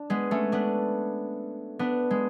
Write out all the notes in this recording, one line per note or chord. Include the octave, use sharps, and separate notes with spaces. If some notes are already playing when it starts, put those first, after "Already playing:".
Already playing: D4
G#3 B3
A3 C#4
B3 D4
B3 D4
G#3